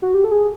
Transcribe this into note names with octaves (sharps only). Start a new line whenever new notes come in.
F#4
G4
A4
G#4